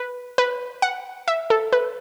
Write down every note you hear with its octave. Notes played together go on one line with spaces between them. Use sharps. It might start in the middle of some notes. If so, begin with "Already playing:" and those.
Already playing: B4
B4
F#5
E5
A4
B4